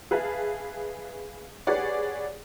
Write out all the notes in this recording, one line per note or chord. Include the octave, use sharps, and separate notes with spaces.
G#4 B4 E5 F5 A5
G4 G#4 B4 C#5 D5 F#5